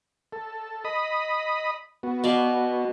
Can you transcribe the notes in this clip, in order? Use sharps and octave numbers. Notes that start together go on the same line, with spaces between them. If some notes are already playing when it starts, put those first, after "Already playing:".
A4
D#5 B5 D#6
B3 F#4
B2 D5 F5